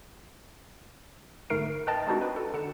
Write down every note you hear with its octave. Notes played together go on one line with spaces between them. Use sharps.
G1 G#2 A3 A#4 C7 D7
A#4 B4 D#5 G5 A5 A6
G#3 C4 D4 D#4 F#4
B4
A4
D3 C#7 E7